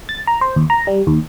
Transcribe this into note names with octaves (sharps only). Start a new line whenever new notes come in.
A6
A#5
C5
D#2
A#5
G3
D#2